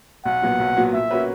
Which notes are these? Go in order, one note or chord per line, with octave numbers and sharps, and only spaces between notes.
B1 F#5
A#2 F#3 B3 F#4
B1
A#2 F#3 B3 F#4
A#2 E5
A#3 C#4 F#4 B4